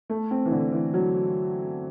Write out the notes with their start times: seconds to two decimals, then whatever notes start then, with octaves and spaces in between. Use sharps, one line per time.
0.10 A3
0.31 C4
0.45 E3
0.51 D3
0.72 E3
0.94 F#3